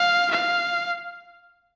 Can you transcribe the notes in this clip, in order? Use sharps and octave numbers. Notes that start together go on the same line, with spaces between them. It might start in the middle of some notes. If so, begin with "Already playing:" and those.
Already playing: F5
F5